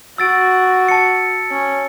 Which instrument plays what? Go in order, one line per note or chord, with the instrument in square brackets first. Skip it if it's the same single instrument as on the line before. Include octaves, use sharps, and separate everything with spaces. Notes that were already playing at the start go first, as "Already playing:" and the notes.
[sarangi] F#4 [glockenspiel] E6 A6 D7
[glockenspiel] A5 C#7
[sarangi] C#4